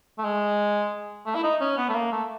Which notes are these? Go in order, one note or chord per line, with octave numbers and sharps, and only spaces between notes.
A3
G#3
A3
E4
D#4
C#4
B3
A3
A#3
A3